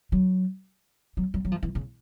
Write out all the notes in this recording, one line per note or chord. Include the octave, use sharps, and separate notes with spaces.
F#3
F#3
F#3
F#3
F3
E3
C#3